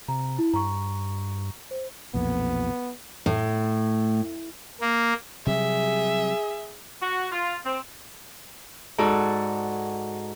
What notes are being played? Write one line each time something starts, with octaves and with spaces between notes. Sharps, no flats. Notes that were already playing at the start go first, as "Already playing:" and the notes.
C3 A#5
E4
G2 A#5 C#6
C5
B1 F2 A#2 B3
A2
A#3
C3 F#3 G3 G#4 E5
F#4
F4
C4
G#2 D#4 F#4 A4 D5